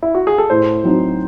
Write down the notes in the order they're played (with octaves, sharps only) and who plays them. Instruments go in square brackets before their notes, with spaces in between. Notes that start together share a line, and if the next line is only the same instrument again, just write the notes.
[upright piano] E4
F#4
G#4
A4
[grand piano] A2 [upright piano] C5
[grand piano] F#3 C4 D#4 F#4